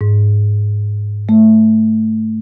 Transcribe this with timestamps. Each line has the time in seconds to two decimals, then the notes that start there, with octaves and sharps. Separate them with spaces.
0.01 G#2
1.29 A3